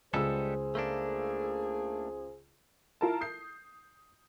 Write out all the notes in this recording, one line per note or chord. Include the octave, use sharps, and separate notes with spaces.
C#2 G3 G#3 G#4 A4 C5 E6
A3 A#3 D4
E4 F4 A#4 A5
D#6 G6 C7